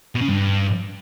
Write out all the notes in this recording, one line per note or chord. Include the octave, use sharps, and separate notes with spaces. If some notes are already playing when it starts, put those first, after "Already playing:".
B2
C#3
G2